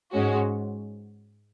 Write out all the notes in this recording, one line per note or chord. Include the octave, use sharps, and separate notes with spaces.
G#2 G#3 C#4 F#4